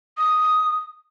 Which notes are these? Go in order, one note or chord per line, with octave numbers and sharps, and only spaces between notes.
D#6